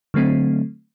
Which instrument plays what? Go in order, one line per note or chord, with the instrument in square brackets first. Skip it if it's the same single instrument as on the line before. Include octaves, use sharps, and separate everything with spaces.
[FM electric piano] D3 F#3 A3 C4